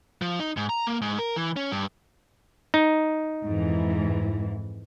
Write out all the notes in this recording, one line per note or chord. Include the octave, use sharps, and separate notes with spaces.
F3
D#4
G#2
A#5
A#3
G#2
A#4
E3
C#4
G2
D#4
F2 G#2 E3